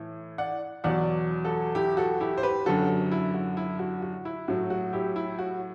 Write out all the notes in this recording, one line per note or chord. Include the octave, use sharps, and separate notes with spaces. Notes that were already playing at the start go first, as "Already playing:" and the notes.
Already playing: A2 E3
D5 F#5
E2 B2 F#3 D5 F#5
F#4 A4
E4 G4
F#4 A4
E4 G4
C5
G4 B4
F#2 D3 F#3 F#4 A4
E4
F#4
E4
F#4
F#4
E4
A2 F#3 F#4
F#4
E4 G4
E4
F#4